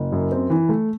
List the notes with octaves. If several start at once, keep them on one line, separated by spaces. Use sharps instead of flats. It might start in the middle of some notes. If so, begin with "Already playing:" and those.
Already playing: F#1
F#2
C4
E3
A3